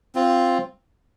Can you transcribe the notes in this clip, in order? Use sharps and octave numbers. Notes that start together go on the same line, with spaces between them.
C4 F4